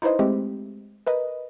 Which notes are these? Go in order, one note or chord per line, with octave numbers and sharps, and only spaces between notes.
D#4 E4 B4 C5 D#5
G#3 A3 C4 G4
A#4 B4 D#5